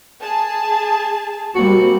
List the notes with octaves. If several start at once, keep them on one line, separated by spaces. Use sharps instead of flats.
G#4 A5
G3 A#3 C4 F#4